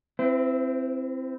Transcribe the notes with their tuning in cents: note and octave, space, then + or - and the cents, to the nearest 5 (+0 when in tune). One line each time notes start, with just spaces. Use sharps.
C4 +0 E4 +20 C5 -45